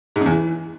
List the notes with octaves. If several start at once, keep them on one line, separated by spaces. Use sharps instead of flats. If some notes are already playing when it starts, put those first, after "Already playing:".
G#2
F#2
E2
E3